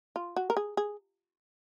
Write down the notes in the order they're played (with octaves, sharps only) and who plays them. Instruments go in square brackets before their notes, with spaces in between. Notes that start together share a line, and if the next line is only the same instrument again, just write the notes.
[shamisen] F4
F#4
A#4
G#4
G#4